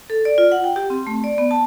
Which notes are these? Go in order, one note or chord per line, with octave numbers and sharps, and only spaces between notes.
A4
D5
F4
F#5
G5
G4
C4
A3
D5
B3
A5